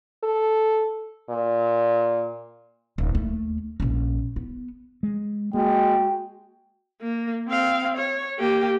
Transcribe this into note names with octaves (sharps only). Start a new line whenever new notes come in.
A4
A#2
D#1
D#2 A3
A#1 C#4
B3
G#3
G#3 A#3 F#4 G5
A#3
C4 F5
C#5
A#3 G4